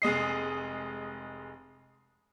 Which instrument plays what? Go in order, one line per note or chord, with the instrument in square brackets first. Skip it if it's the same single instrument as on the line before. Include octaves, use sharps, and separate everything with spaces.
[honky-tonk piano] F1 G#3 D#5 C7